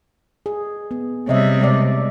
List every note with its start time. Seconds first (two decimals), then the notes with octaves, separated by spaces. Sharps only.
0.46 G#4
0.91 B3
1.28 C3 G3 C#5 D#5 E5
1.61 G#3 D5